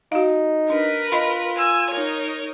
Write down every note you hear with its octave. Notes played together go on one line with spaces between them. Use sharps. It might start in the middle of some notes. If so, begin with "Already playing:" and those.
D#4 F#4 F5
D4 A#4 B4
F4 D#5 B5 C6
G#5 E6
D#4 A#4 C#5